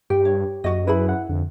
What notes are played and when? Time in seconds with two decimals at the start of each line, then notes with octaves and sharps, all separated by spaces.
0.10 G2 G4 G5
0.25 C#5
0.64 F#2 F#4 D#5
0.87 E4 G#4 B4 B5
1.09 F#5
1.29 F2 D3